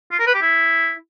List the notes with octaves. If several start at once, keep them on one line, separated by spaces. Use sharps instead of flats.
F4
A#4
B4
G4
E4